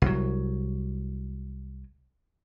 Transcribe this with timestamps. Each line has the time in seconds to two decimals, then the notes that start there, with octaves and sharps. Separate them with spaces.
0.02 C2 F#3